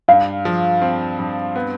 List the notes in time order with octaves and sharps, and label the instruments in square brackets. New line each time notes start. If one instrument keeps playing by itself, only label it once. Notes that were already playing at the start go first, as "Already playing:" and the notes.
[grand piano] G2 [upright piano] F5
[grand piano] F3
C4
G2
B3